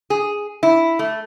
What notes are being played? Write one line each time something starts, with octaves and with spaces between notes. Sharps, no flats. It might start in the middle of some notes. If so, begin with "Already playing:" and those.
G#4
E4
A3